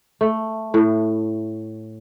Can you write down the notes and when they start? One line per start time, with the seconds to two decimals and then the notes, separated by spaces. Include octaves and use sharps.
0.21 A3
0.74 A2